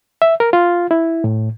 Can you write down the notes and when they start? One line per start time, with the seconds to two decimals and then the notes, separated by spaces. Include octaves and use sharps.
0.22 E5
0.40 A#4
0.53 F4
0.91 E4
1.24 A2